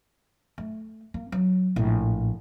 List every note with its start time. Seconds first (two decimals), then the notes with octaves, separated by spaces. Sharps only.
0.58 A3
1.14 A#3
1.32 F#3
1.76 A#1 A2